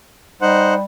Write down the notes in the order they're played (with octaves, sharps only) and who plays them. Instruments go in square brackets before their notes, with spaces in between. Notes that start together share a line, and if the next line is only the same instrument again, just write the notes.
[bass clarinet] G3 [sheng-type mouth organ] D#4 C5 F#5